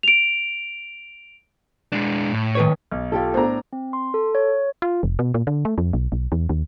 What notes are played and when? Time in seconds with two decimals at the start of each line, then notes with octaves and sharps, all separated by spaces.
0.03 D7 F7
1.92 G#3 D4
2.32 A2
2.55 D#3 B4 C#5
2.91 B1
3.12 F4 G4 A4
3.34 A2 B3 D4 A#4 C5 A#5
3.73 C4
3.93 C6
4.14 A4
4.35 C#5
4.82 F4
5.03 F1
5.19 B2
5.34 A#2
5.47 D3
5.65 A3
5.78 F2
5.93 B1
6.12 B1
6.32 E2
6.49 D#2